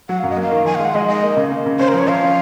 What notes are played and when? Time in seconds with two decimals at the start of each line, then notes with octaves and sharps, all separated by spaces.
0.09 F#3 F#5
0.19 F#2 F5
0.30 D#5
0.37 A#3 F5
0.51 D#3
0.65 F3 G#5
0.75 G#3 F5
0.85 F#5
0.94 G#3 D#5
1.08 D#4 D#5
1.23 A#3
1.37 C#3
1.51 A#3
1.66 C#3
1.79 C#4 C5
1.88 A#4
1.94 F3 C#5
2.08 F3 F5
2.23 C#4